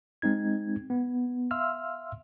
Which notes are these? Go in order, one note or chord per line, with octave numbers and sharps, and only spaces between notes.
G#3 C4 D#4 G#6
B3
E5 F5 C6 E6 F6